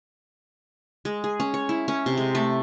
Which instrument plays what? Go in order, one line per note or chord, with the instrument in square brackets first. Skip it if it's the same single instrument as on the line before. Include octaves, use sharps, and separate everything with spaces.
[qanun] G#3
G#4
C#4
C#5
E4
C#4
C3
G#3
A3